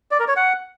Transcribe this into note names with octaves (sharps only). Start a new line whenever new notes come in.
D5
A#4
C#5
F#5